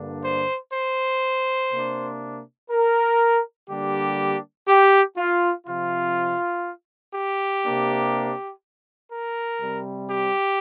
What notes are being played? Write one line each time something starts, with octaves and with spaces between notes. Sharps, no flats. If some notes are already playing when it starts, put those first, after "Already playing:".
Already playing: G2 D3 A#3 D4
C5
C5
C3 A#3 D4
A#4
D3 G3 A#3 D4 G4
G4
F4
C3 F3 C4 F4
G4
C3 A#3 D4
A#4
C3 G3 C4
G4